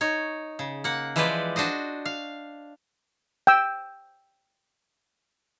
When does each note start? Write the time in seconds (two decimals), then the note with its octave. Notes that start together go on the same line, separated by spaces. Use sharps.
0.01 D#4 C#5
0.59 C#3
0.84 A#3 F#5
1.16 E3 F3 G#3 G4 B4 D5
1.56 D4 F#4 C5 D#5
2.05 F5
3.47 G5 E6